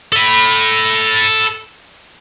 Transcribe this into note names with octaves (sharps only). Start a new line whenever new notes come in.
A4 B5